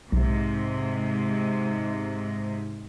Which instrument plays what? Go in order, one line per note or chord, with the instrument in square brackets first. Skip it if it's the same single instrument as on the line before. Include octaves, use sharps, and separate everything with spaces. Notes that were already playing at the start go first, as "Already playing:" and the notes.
[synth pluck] B1 [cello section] G#2 C3